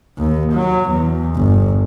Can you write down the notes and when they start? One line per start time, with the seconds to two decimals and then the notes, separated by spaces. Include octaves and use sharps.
0.18 D#2
0.53 F#3
0.91 E2
1.35 G1